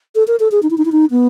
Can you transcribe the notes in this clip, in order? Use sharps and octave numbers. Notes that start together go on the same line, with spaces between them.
A4
A#4
A4
G#4
D#4
E4
D#4
E4
D#4
B3